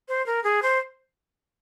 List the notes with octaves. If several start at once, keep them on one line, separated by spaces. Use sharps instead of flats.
C5
A#4
G#4
C5